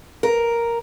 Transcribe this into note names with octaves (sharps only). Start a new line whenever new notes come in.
A#4